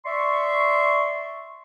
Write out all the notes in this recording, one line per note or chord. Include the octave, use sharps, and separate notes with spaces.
D5 E5 C6 C#6